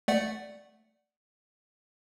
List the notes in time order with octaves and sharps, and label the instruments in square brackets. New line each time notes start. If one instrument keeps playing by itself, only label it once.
[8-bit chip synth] A3 D5 F#5